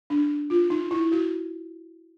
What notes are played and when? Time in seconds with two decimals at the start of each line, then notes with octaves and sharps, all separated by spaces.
0.10 D4
0.50 F4
0.70 D#4
0.91 E4
1.12 F#4